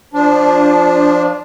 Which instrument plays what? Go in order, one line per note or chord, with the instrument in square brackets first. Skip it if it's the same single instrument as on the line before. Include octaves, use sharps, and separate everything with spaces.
[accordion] F3 D4